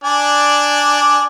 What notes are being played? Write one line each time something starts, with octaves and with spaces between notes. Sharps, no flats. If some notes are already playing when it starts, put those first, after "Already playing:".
D4 D5 G#5